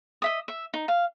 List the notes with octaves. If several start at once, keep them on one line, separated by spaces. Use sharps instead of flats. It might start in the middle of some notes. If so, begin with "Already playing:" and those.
D#5 E5 D#6
E5
D#4
F5